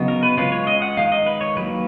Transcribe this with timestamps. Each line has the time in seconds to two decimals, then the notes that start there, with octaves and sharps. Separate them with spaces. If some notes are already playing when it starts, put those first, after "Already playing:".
Already playing: C#3 F#3 B3 D#4
0.08 A#4
0.23 B4
0.37 G#3 C#4 F4 B4
0.52 C#5
0.67 D#5
0.82 F#5
0.97 D#3 G#3 D#4 F5
1.12 D#5
1.26 B4
1.41 C#5
1.57 D#3 F#3 A#3 B4